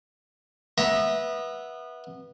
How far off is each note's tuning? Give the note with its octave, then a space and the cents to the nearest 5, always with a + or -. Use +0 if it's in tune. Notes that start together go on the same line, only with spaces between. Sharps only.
B3 -15 E5 -15 A#5 +15